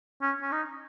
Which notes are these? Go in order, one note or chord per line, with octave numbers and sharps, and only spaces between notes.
C#4
C#4
D#4